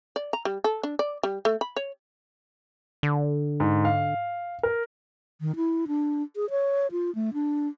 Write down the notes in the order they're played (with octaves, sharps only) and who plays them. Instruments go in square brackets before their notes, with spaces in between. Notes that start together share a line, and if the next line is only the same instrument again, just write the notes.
[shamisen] D5
A#5
G3
A4
D4
D5
G3
A3
B5
C#5
[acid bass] D3
[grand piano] G#2
F5
A#4
[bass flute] D#3
E4
D4
G#4
C#5
F4
A3
D4